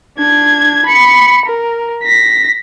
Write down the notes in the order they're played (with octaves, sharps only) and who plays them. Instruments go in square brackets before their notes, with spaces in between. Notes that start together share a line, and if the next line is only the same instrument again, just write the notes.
[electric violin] D4 G#6
B5 C#7
A#4
A#6 B6